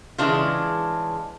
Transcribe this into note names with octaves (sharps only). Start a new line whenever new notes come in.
C#3 E3 G#3 D4 F4